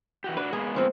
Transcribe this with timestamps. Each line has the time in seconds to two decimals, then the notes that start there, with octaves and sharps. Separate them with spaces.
0.24 E3 F#4 G4
0.37 D4 F#4 B4
0.53 G#3 A#3 B3 G#4
0.75 D3 F3 C4